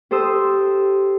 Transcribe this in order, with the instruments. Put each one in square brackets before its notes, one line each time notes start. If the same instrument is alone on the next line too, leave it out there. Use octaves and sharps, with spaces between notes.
[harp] G4 A4 C5 D#6 E6